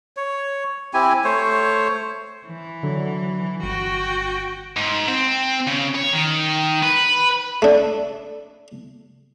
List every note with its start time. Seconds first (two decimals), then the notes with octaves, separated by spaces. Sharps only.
0.17 C#5
0.94 C4 E4 G4 G#5
1.24 A3 C5 C#5
2.47 E3
2.83 D3 F#3
3.63 G1 F#4 G5
4.76 G#2
5.08 C4
5.67 C#3
5.95 C#5
6.13 D#3
6.83 B4
7.62 A3 D4